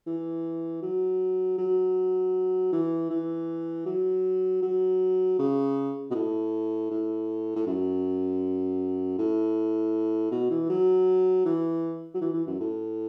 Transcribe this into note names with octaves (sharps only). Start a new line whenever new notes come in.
E3
F#3
F#3
E3
E3
F#3
F#3
C#3
B2
A2
A2
A2
F#2
A2
B2
E3
F#3
E3
F#3
E3
E3
F#2
A2